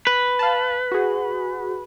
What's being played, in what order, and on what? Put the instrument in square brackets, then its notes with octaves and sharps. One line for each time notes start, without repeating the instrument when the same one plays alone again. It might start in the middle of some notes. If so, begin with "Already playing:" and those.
[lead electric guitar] B4
[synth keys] F5 A5
F#4 G#4